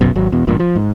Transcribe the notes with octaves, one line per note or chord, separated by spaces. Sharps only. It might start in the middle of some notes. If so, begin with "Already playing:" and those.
F1 B1 F#2 B2
G#1 F#3
E2 B2
A1 G2 A#2
F3
G#2